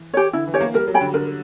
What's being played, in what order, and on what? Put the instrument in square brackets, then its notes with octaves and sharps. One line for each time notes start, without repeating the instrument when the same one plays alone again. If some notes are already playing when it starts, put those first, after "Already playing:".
Already playing: [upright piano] E3
[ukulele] G4 C#5
[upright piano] D3 [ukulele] E4
[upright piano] E3
[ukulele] G4 C#5
[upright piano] A#3
[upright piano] G3 [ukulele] A#4
[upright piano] F#3
[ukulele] C#5 G5 B5
[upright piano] D3
[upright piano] D3 [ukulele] A#4